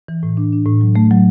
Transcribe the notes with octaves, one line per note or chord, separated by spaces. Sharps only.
E3
A2
D4
D4
A2
F#3
A3
F#3